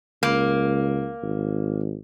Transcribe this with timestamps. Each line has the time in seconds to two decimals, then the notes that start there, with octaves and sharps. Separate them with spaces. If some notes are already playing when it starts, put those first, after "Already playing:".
0.23 C#2 A#3
1.23 G#1